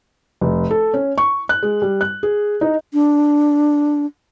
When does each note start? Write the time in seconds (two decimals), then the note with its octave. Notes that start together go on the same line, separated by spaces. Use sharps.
0.41 F1
0.71 A4
0.94 C#4
1.18 C#6
1.49 F#6
1.63 G#3
1.82 G3
2.01 F#6
2.23 G#4
2.61 D#4
2.93 D4